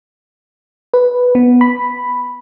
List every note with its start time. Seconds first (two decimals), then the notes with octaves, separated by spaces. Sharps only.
0.94 B4
1.35 B3
1.61 B5